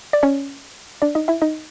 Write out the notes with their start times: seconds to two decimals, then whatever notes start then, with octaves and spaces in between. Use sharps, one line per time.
0.13 D5
0.23 C#4 C#5
1.02 D4 D5
1.15 D#4 D#5
1.28 E4 E5
1.42 D#4 D#5